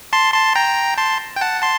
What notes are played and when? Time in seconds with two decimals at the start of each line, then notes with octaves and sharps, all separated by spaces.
0.13 A5 C6
0.34 A5 C6
0.55 G5 A#5
0.98 A5 C6
1.36 G5
1.41 F#5 A5
1.62 A5 C6